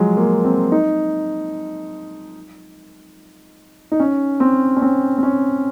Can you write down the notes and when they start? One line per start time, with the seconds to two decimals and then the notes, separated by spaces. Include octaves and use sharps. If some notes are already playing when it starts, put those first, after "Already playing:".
Already playing: F3 F#3 G#3
0.17 A#3
0.44 C4
0.72 D#4
3.92 D#4
4.00 C#4
4.40 C4
4.76 C#4
4.82 C4
5.18 C4
5.23 C#4